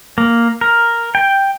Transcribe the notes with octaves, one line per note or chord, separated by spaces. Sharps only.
A#3
A#4
G5